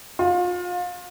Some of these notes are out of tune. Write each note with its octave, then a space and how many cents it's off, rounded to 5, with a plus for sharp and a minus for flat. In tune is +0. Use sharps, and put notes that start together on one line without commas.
F4 +30